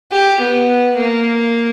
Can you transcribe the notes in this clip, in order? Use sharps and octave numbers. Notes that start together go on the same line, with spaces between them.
G4
B3
A#3